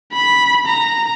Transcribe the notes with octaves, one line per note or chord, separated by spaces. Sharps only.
B5
A#5